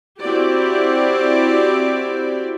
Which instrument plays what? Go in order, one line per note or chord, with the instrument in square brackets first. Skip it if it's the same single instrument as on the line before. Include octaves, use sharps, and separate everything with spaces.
[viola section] C4 E4 F#4 G4 D5